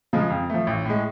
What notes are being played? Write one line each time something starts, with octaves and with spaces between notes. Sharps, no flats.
C#3 F3 G#3
F2
F3 A3
A1
A2 G#3